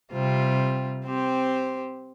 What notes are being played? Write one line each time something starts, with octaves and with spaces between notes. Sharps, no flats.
C3 G3 C4 F4
C4 G4 C5